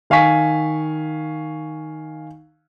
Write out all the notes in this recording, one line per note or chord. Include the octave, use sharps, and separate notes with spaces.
D#3 F5 G#5 C#6 B6